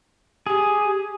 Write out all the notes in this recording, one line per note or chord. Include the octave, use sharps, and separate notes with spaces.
G4 G#4